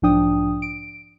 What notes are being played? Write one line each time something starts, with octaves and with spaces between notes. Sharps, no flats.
B1 G#2 F3 D4 G5 D#6
D7